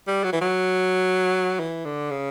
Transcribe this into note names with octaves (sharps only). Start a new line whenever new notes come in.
G3
F#3
E3
F#3
E3
D3
C#3